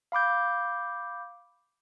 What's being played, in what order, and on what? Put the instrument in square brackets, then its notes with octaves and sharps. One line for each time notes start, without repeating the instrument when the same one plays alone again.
[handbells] F5 B5 D6 G6